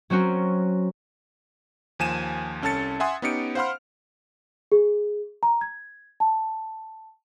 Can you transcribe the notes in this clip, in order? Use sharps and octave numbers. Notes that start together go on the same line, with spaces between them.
F#3 C4 C#4 F#4 A#4
D#2 F3 G#5 D#7 E7
C2 C#4 A4 A5 A6 C#7
E5 F#5 G#5 C6 D#6
B3 C#4 D#4 G4 C#7 D7
C5 F5 F#5 B5 C6 F6
G#4
A#5
G#6
A5